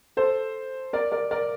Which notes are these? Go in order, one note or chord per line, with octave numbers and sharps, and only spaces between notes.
A4 C5
A#4 D5
A#4 D5
A#4 D5